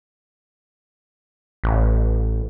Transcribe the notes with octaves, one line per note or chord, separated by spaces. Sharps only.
A1